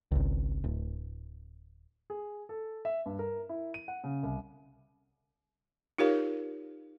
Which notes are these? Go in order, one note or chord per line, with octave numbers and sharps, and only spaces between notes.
G#1 C#2
D1
G#4
A4
E5
G2
A#4
E4
D#7
F#5
C#3
C2
D#4 F4 G4 A#4 C#5 F5